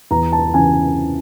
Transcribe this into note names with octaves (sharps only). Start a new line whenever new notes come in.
E2 A#5
A5
C#3 E3 G#5